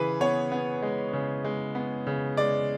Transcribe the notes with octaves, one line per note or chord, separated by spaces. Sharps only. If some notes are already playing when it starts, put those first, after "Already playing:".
Already playing: C#3 E3 G#4 B4
B3 C#5
B3
G#3
C#3
G#3
B3
C#3
G#3 D5